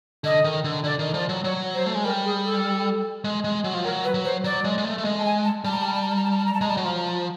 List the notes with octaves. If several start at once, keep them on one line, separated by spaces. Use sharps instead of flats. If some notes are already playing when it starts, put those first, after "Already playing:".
D3 D#5
D#3
D3
D3 D5
D#3
F3 D5
F#3
F#3 C#5
C5
A3
G#3
G3 A#4
G#4
A4
G#3
G#3
F#3
F3
F#3 A#4
B4
F#3
C5
F#3 D5
G#3
G#3
A3
A3
G#3 D#5
A5
G#5
A5
G3 A5
A#5
A5
A#5
A5
A#5
A5
A#5
A5
A#5
A5
A#5
A5
G#3 A#5
G3 A5
F#3
F3 A#5
A#5
A5